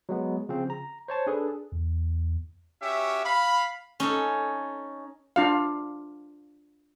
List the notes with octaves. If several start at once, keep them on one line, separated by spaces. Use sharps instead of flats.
F#3 G#3 B3
C#3 F3 C4
A#5
C5 C#5 A5
D4 G#4 A4 B4
E2
C#4 F#4 G4 E5
F5 B5
C#4 D#4 A4
D4 F4 F5